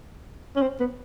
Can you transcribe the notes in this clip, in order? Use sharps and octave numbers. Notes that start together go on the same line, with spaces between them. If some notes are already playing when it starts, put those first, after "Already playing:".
C#4
C4
B3